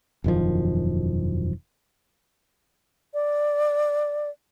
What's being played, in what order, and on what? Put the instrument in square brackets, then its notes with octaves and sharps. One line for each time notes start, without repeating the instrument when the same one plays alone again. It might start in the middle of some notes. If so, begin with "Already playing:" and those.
[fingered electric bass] E1 F#2 D#3 F3
[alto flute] D5